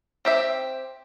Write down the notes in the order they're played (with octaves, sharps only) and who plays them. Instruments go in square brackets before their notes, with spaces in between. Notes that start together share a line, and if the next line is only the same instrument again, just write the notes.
[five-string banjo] C4 G4 E5